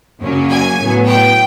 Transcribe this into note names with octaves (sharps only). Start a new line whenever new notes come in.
F#2 C#3 F#3 A#3 C#4
G#5
A2 F#3 B3
G5